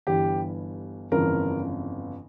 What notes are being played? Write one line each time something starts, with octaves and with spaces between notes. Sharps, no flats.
G1 G2 E3 G4
G1 F2 C#3 E3 A#4